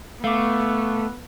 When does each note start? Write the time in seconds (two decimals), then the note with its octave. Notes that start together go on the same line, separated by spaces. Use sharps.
0.24 A3 B3 F5 D6